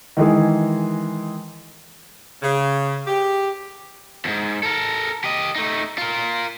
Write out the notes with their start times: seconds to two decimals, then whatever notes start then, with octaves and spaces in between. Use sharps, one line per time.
0.17 D#3 E3 G#3 G#4
2.43 C#3
3.07 G4
4.25 D#2 G#2
4.63 A4 A#4
5.24 G4 D#5
5.56 A3 D#4
5.98 F4 A#4